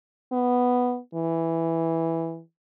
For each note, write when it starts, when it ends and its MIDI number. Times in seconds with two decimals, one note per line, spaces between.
0.32 0.99 59
1.14 2.41 52